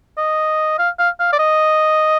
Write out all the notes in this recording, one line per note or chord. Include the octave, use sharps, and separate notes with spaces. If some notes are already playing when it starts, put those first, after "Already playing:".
D#5
F5
F5
F5
D5
D#5